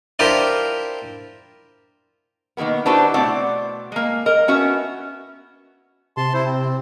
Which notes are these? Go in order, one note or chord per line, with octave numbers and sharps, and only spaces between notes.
D4 E4 F4 G4 A#4 C5
B2 D#3 G#3 A#3 B3
D4 E4 F#4 G4 B4 C5
B2 A3 C4 D5 F#5
G#3 A#3
A#4 D#5
B3 C#4 F#4 E5
C3 A5 C6
E4 C5
C4